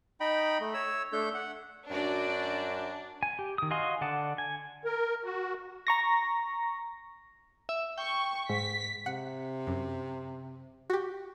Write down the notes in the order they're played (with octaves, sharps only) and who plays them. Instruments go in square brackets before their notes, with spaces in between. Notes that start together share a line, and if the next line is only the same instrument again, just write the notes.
[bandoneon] D#4 D#5 G5 B5
A3
C#5 E6
A3 D4 A4 G6
F#5
[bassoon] F#2 [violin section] D4 [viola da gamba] F#4 D5
[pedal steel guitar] G#5
G4
D#3 D#6
F#4 D#5 F5 G#5 C6
D3 D5 F#5 A5
G#5
[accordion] A#4
F#4
[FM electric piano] A#5 C#6 A#6
[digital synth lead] E5
[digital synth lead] G5 [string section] C#6
[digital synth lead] G#2 [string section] B6
[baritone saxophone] C3 [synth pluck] F#5
[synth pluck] F#2
F#4 G4